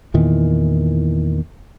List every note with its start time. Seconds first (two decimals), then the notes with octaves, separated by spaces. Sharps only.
0.14 E2 A#2 D#3 E3